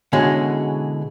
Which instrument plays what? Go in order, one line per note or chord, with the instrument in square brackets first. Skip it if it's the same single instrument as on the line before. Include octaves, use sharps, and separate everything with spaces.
[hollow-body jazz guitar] B2 D3 E3 G#3 C#4